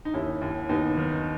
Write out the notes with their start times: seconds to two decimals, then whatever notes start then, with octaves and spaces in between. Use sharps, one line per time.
0.05 D#4
0.14 D#2 C#4 E4
0.41 D#2
0.69 D#2 B3 D#4
0.97 D#3